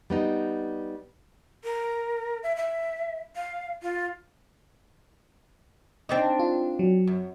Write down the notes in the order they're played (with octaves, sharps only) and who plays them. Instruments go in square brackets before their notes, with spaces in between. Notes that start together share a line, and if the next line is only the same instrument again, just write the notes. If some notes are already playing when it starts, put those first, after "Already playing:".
[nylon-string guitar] G3 B3 D#4
[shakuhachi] A#4
E5
E5
F5
F4
[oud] C4 D4 D#4
[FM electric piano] F4
F#3
[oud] F#2